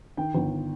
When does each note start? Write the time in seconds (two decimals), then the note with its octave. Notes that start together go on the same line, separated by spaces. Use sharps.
0.17 D#3 G5
0.35 G1